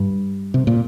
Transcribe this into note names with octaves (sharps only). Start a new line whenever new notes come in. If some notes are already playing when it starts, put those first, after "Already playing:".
Already playing: G2
C3
A#2